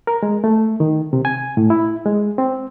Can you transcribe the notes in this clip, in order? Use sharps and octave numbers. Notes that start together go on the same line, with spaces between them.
A#4
G#3
A3
D#3
C3
G#5
A2
E4
G#3
C4